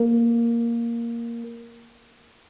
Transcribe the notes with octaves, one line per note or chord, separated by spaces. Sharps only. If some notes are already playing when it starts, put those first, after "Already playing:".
Already playing: A#3